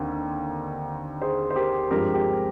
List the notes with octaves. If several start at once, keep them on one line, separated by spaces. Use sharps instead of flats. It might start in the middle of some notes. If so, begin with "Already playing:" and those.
Already playing: D#2 D3 C4
G#4 C5
C5
G4 A#4
G2 F3 G#3 C4 G4 A#4
G4